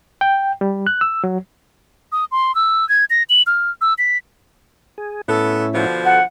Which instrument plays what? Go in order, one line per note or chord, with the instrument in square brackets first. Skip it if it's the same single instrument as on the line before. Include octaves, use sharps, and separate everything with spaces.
[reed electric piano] G5
G3
F#6
E6
F#3
[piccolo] D#6
C6
E6
G#6
A#6
F#7
F6
E6
B6
[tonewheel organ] G#4
[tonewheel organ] A2 C#4 E4 [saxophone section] B3 A4
[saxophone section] B2 D3 F3
[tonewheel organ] A4 [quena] F#5